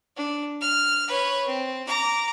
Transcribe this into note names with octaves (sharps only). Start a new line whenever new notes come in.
D4
F6
B4 C#5
C4
A#5 D6